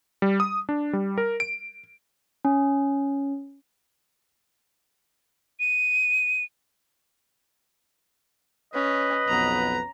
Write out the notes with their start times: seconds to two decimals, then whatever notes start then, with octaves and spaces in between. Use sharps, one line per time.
0.22 G3
0.40 D#6
0.69 D4
0.93 G3
1.18 A#4
1.40 D7
2.45 C#4
5.60 D#7
8.74 C#4 B4 D#5
9.28 B1 F2 B3 A#5